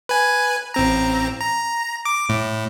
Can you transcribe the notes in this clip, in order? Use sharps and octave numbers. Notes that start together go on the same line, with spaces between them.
B4 G#5
A1 C4 A#5
A#5
D6
A2